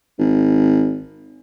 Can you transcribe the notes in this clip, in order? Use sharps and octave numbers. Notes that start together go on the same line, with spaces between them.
G#1